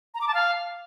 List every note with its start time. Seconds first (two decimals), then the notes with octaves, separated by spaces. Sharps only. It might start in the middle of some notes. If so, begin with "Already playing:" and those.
0.14 A#5
0.21 D6
0.28 A5
0.34 F5